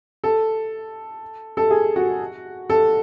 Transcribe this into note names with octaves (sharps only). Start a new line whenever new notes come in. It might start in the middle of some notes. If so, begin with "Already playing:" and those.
A4
A4
G#4
F#4
A4